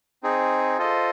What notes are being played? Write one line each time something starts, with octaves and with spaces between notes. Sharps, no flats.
C4 D#4 G#4
F4 A4 C5 D#5